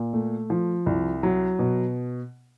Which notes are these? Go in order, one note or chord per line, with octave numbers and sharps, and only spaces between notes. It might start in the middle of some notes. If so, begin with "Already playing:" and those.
Already playing: A#2
A3
F3
C2
F#3
B2